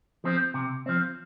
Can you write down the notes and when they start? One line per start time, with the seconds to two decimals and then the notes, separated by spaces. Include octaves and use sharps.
0.24 F3 C4
0.54 C3
0.86 F3 C4